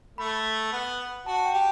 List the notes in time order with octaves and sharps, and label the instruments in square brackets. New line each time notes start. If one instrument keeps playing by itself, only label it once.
[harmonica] A3 [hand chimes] B5
[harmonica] B3
[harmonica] F#4 [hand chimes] A5
[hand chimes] G5
[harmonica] G4